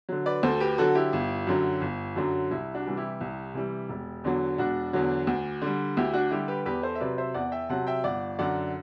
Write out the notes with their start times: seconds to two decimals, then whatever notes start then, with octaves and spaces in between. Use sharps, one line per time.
0.09 D3 F#3
0.26 B4 D5
0.43 D2 A4 C5
0.60 G4 B4
0.78 D3 F#3 F#4 A4
0.95 E4 G4
1.13 G1
1.47 F#2 D3 F#3
1.81 G1
2.16 F#2 D3 F#3
2.51 C2 E4
2.74 D4 F#4
2.86 C3 E3 G3
2.97 E4 G4
3.21 C2
3.54 C3 E3 G3
3.89 E1
4.24 E2 D3 F#3
4.58 E1 D4 F#4
4.93 E2 D3 F#3
5.27 D2
5.62 D3 G3
5.97 D2 E4 G4
6.13 D4 F#4
6.31 D3 G3 E4 G4
6.48 G4 B4
6.66 E2 G4 B4
6.83 A4 C5
6.95 E5
7.00 C3 F#3 B4 D5
7.18 C5 E5
7.34 E2 D5 F#5
7.52 E5 G5
7.69 C3 F#3 F#5 A5
7.87 E5 G5
8.04 G1 D5 F#5
8.39 F#2 D3 D5 F#5